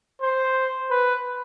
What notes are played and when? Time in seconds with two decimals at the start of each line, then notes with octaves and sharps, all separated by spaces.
0.22 C5
0.91 B4